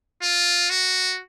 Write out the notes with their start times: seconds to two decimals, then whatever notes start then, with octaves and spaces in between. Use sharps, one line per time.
0.22 F4
0.70 F#4